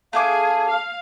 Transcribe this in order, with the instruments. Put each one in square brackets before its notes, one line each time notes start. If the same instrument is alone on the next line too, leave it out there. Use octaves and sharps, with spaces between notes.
[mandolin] A3 D4 D6 [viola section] G#4 [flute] F5
[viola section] F5